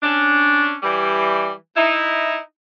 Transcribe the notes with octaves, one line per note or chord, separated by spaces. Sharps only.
C#4 D4
E3 G3
D#4 E4